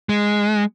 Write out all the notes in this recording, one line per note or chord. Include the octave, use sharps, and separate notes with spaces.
G#3